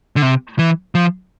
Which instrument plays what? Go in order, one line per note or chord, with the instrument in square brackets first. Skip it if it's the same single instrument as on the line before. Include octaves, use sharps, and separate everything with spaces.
[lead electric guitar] D3
C3
E3
F3